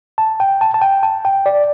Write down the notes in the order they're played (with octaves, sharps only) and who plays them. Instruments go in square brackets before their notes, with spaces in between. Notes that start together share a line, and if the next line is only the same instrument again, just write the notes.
[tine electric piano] A5
G5
A5
A5
G5
A5
G5
D5